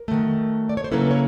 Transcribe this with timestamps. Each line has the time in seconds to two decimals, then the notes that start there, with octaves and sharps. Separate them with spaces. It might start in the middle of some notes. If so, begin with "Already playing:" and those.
Already playing: A#4
0.08 D#3 F#3 A3
0.69 D5
0.77 C#5
0.84 C5
0.91 C#3 F#3 A#3 C#4 E4 A4 B4
1.11 C#5